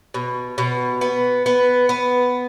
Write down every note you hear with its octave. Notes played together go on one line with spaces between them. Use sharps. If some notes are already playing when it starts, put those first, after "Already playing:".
B2
B2
B3
B3
B3